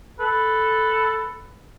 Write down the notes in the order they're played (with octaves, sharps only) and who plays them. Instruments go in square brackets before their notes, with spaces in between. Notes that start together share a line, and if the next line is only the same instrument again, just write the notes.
[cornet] A4 [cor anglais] B4